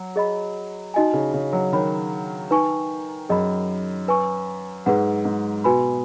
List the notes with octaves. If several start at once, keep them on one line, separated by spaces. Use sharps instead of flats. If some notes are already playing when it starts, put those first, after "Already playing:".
Already playing: F#3
G#4 D#5 B5
D#4 F#4 D#5 G#5
C#3
C#3
F#3
D#3 C#5 B5
D#4 B4 G#5 C#6
F#2 G#4 D#5 B5
B4 G#5 C#6
G#2 G#4 B4 F#5
G#2
B2 F#4 B4 G#5 B5